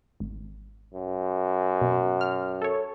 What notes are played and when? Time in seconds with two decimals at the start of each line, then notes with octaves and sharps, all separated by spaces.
0.20 G#1
0.94 F#2
1.81 B2
2.21 F6
2.62 A4 C#5